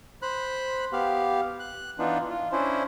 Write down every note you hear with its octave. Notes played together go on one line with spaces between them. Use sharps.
C5 B5 F#6
B3 G4 F5
F#6
E3 B3 D4 D#4 F4
F4
C#4 D4 E4 C5